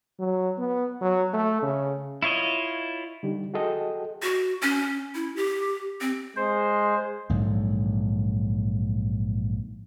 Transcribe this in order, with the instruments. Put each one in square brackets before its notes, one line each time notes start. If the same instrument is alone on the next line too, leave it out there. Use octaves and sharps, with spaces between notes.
[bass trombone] F#3
B3
F#3
A3
C#3
[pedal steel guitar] E4 F4 C#5 D#5
[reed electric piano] D3 G3 D#4 G4
F#4 G#4 A4 D#5 G5
[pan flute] F#4
C#4
E4
G4
C4
[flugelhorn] G#3 [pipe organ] C5
[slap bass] A#1 G#2 D3 F#3